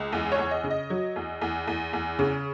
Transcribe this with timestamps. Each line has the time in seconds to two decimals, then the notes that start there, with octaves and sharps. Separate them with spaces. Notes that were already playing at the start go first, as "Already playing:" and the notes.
Already playing: C#2
0.12 E2
0.32 C#5
0.38 E2
0.51 D#5
0.64 C#3
0.70 D#5
0.90 F#3
1.16 E2
1.41 E2
1.67 E2
1.93 E2
2.19 C#3